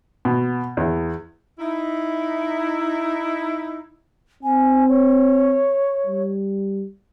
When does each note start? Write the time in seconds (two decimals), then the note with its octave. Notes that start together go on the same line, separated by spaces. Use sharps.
0.25 B2
0.77 E2
1.59 D#4 E4
4.43 C4 G#5
4.89 C#5
6.07 G3